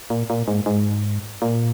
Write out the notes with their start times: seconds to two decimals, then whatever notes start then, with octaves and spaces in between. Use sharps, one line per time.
0.10 A#2
0.30 A#2
0.48 G#2
0.66 G#2
1.42 A#2